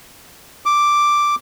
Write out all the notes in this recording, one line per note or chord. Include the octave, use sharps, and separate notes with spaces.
D6